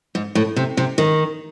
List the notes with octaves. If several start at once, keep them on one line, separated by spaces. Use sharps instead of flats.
G#2
A2
C3
C3
D#3